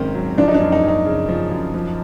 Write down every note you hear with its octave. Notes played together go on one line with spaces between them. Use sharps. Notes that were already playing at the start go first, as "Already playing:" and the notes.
Already playing: G#1 G#2 D#3 F#3 C4 C#4
F#3
F3 D4
D#4
D4
F#2
D#4
F#2 D#4
C#3
F3
F#2
F3